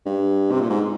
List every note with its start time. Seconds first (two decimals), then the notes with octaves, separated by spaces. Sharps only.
0.06 G2
0.52 C3
0.61 A#2
0.70 G#2